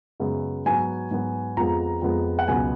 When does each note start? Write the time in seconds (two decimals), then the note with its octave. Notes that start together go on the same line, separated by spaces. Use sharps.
0.20 F#2 C#3 G#3 B3
0.66 G#2 F#3 B3 G#5
1.11 G#2 F#3 B3
1.57 F2 F3 G#3 B3 A#5
2.02 F2 F3 G#3 B3
2.39 F#5
2.48 C#2 B2 F#3 B3 G#5